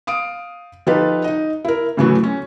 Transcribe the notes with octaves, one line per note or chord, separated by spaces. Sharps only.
F5 D#6 D7
F3 D#4 F4 G4 A4 B4
D#4 D#5
E4 A#4
A2 C#3 E3 F#3 A3 F#4
C#4